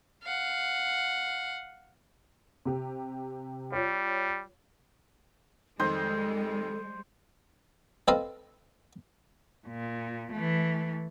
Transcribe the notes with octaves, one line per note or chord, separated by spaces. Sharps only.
F5 F#5
C3 G4
G3 F4 C#5
F2 D#3 G3 G#3 A4 C5 D#5
C4 A4 B4 D#5 F5
A#2
E3 A3